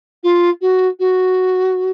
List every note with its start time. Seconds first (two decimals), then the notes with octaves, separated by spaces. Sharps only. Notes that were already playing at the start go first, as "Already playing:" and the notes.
0.23 F4
0.61 F#4
0.99 F#4